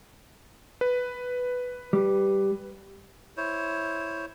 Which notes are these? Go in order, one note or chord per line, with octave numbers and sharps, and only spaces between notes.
B4
G3
E4 C5 C#5